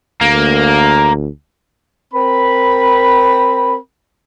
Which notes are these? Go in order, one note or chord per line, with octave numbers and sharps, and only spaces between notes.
D2 A#3
C4 A#4 B5